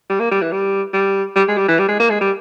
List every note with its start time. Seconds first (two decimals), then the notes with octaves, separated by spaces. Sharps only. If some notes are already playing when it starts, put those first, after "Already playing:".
0.09 G3
0.20 A#3
0.31 G3
0.41 E3
0.52 G3
0.93 G3
1.35 G3
1.48 G#3
1.57 G3
1.68 E3
1.78 G3
1.88 G#3
2.00 A#3
2.10 G#3
2.21 G3